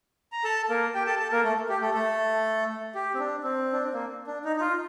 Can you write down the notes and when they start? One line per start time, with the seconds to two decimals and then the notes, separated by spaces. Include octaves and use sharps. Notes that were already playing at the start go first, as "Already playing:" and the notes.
0.32 A#5
0.44 A4 A5
0.70 A#3 A#4
0.95 G4 G5
1.06 A4 A5
1.19 A4 A5
1.32 A#3 A#4
1.44 A3 A4
1.69 G4
1.81 A3 A4
1.94 A3 A4
2.95 G4
3.14 C4
3.19 D4
3.44 C4
3.73 D4
3.83 C4
3.93 A#3
4.27 D4
4.45 D#4
4.56 D#4
4.61 F4